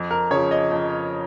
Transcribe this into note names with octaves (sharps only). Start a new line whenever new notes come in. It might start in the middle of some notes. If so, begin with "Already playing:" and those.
Already playing: F2
A#4
C#3 F3 C#5
D#5
F2